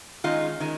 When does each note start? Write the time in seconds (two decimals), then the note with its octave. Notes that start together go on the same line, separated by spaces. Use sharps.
0.24 D#3 G#3 C#4 D#4 F4
0.60 D#3 G#3 C#4